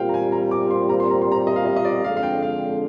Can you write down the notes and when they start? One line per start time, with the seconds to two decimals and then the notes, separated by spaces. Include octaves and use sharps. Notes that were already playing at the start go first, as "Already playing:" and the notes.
Already playing: A#2 G3 C4 F4 F5 G5
0.09 A#5
0.14 G#5
0.32 A#5
0.51 D6
0.70 C6
0.89 A#5
1.00 C6
1.10 A#5
1.22 C6
1.32 A#5
1.47 D#5
1.56 F5
1.66 D#5
1.76 D#5
1.85 D5
2.04 F2 D3 G#3 D4 F5
2.17 F5
2.23 G5
2.42 F5